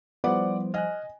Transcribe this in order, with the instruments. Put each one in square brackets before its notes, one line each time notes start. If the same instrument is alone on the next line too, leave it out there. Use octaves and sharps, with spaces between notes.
[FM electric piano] F3 G3 C5 [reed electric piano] B3 E4 [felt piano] D5 F#5 D6
[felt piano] D#5 G#5 [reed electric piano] F6 F#6